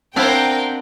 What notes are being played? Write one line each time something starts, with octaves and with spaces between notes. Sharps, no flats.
B3 C4 D4 E4 A#4 C5 F5 G5